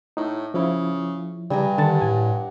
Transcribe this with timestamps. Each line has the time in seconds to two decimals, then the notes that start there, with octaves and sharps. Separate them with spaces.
0.17 A2 D#4
0.54 C#3 F3 E4
1.50 G2 C#3 G3 G#5 A#5
1.78 D3 D#3 F#5 A5 A6
2.02 A2 G#5